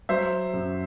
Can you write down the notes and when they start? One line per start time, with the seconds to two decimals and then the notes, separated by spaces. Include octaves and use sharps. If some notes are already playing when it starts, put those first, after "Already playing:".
0.09 F#3 C5 E5
0.54 F#2